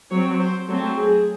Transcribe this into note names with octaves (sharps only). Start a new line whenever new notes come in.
F#3 C4 C#5
C5
F#3 A3 C4 A4
G#4